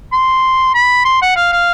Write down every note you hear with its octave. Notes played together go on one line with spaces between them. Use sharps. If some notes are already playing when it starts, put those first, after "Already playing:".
C6
B5
C6
F#5
F5
F5